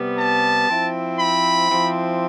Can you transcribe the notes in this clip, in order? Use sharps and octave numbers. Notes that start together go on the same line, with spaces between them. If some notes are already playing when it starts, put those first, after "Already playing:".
Already playing: C3 G3 B3
A5
F3 C4 E4
B5
F3 C4 E4